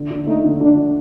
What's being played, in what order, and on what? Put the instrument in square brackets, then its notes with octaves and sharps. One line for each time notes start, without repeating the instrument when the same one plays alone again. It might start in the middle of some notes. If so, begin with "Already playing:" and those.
Already playing: [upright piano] D3
D3
[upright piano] A3 [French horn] D#4
[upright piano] D3
[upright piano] D3 [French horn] D4
[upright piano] D4